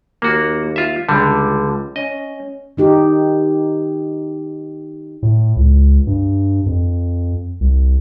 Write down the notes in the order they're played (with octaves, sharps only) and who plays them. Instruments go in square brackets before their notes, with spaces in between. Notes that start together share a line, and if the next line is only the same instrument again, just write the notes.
[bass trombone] D#2 [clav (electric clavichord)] A#3 F#4
[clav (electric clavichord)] F4 E5
[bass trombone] C#2 [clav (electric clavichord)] D3 G3
[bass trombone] C#4 [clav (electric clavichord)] D#5
[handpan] D#3 D#4 G4
[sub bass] A2
C#2
G2
F2
C2